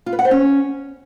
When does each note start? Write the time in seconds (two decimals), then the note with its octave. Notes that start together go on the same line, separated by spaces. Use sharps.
0.06 F4
0.13 B4
0.19 F#5
0.25 C5
0.31 C#4